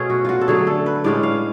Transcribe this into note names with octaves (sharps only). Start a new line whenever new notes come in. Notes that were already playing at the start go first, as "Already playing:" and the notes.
Already playing: B2 A3 C#4 G#4
F#4
F4 F#4
A4
D3 F#3 A3 G#4
A4
B4
A2 G#3 C#4 D5
F5